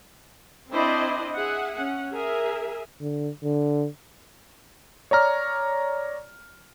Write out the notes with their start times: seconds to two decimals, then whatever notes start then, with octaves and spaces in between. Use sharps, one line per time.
0.71 C4 D4 E4 C5 D5 D#5
1.35 G#4 E5 F#5
1.76 C#4 F#5
2.13 G#4 A#4 E5
3.01 D3
3.43 D3
5.11 C#5 D5 A#5 F6